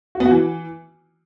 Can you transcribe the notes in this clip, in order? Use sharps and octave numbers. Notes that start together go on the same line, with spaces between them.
F#4
B3
F#4
E3